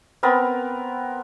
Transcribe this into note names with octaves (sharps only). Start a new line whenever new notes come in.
B3 C4 A#4 B5